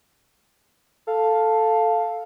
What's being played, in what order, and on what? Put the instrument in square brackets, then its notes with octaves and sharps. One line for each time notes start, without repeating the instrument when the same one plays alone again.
[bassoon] A4 [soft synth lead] F5